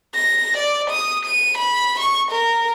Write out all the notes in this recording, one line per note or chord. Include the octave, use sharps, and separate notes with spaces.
A#6
D5
D#6
D#7
B5
C#6
A#4